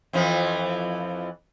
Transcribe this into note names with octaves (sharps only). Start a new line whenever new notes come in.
F2 E3 F3